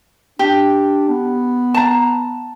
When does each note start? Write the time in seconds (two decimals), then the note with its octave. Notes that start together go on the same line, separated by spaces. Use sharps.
0.39 D4 G4
1.09 B3
1.74 A5 A#5